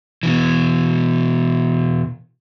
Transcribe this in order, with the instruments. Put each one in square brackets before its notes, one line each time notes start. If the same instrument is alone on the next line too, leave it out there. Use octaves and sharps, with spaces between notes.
[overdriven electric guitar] B2 E3